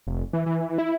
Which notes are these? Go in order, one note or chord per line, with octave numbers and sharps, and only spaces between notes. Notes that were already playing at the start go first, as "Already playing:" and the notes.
F1
E3
E3
E4